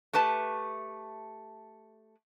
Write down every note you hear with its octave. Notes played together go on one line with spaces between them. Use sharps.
A3 G4 B4 A5